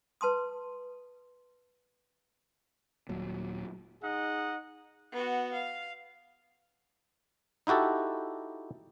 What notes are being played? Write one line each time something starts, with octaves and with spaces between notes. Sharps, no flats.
B4 A5 C6 D#6
D#1 A#2 F#3
D#4 G#4 D#5 F#5
B3 F#4
F5
D#4 E4 F#4 G4 A4